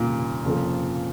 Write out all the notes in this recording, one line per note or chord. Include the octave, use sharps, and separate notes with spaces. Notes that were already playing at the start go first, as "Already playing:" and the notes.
Already playing: F1 D#2 A#2 C#3 G3
F1 F2 C#3 F3 A#3